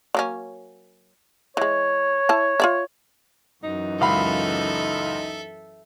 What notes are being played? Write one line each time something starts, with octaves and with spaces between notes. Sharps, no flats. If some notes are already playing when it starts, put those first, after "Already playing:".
F#3 A#3 C#4
E3 G#3 C#5
E4 A5
F4 D5 E5
F#2 E3 D#4
C#2 A4 E5 F5 B5